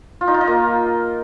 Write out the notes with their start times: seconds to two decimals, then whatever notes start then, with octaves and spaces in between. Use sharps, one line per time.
0.21 F4
0.28 D#4
0.34 F4
0.41 D#4
0.47 A#3